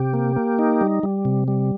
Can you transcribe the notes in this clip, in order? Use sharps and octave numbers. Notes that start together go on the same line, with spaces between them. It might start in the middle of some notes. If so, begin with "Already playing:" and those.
Already playing: C3 G4
A#3
A#3
D#4
G3
G3
C3
G3